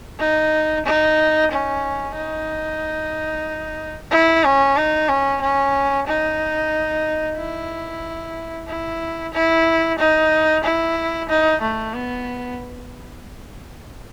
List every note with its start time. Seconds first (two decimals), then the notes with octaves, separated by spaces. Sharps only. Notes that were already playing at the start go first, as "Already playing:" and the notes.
0.19 D#4
0.86 D#4
1.51 C#4
2.16 D#4
4.11 E4
4.44 C#4
4.77 D#4
5.09 C#4
5.41 C#4
6.07 D#4
7.37 E4
8.68 E4
9.33 E4
9.98 D#4
10.64 E4
11.29 D#4
11.61 A3
11.94 B3